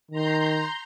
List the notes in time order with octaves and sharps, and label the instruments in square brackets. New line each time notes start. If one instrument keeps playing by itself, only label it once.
[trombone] D#3 [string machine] A#5 C6 G6